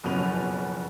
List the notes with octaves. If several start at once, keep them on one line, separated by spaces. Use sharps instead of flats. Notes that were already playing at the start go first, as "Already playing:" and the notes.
F#1 F2 B2 C#4 D#7 F7